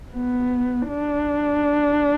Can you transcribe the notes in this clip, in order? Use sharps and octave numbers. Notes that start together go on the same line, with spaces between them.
B3
D4